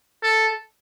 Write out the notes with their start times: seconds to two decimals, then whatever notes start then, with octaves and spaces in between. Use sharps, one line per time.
0.22 A4